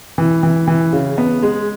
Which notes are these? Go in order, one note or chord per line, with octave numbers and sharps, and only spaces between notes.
E3
E3
E3
C#3
B3
G#3